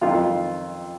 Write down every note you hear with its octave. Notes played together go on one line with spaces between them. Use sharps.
F2 D#3 F4